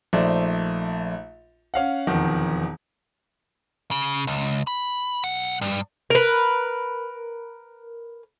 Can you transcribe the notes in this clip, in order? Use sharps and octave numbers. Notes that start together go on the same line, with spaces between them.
A#1 A3 D#4 C5 D5
C#4 F5 F#5
E1 F2 D#3 F#5
C#3
C#2
B5
B1 F#5
G2
A#4 B4